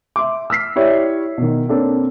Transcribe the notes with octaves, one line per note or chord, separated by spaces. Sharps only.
E5 C6 D6
E6 F6 B6 C7
E4 G4 C#5 D5 E5
B2 D#3
A#3 C4 D4 A4 C#5